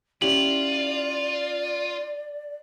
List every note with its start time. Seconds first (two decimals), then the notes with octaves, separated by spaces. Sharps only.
0.22 C#4 E4 F4 G4 D5 F#7